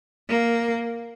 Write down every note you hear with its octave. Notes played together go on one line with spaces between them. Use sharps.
A#3